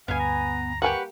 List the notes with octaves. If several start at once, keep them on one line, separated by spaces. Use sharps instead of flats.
D2 G2 B3 F5 G#5
A#5
G3 A#3 G4 B4 F#5 G#5 C#6